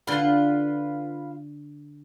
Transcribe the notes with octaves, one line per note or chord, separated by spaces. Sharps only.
D3 F4 B4 F#5 C6